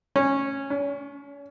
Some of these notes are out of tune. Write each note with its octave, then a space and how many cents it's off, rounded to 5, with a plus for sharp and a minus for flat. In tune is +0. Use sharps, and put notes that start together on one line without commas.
C#4 -10
C#4 +40